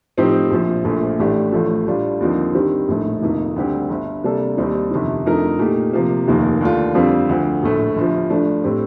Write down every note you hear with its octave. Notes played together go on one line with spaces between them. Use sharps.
A2 F3 C4 D#4 G4
A#1 A#2 F3
A#1 A#2 F3 A3
A1 A2 A3 D4 G4
A1 A2 F3 A3
A2 G3 D4 F4
D#2 D3 F3 C4 D#4
G2 D#3 G3 C4 G4
A#1 A2 A3 D#4
F1 F2 D#3 A#3 D#4
D2 D3 G3 C4 G4
G1 G2 D3
C3 G3 A#3 D4 A4
D#2 D#3 G3 C4 D#4
G1 F2 C3 D#3
F2 D3 A3 D#4 A#4
A#2 A3 D#4 G4
C3 F3 A#3
F1 D#2 D#3 A#3
D#2 D3 A3 D4 F4
F2 D3 G3 C4 F4
D2 D3 F3
A#1 A2 A3
G1 G2 F3
G2 F3 A3 D4
A2 A3 C4 G4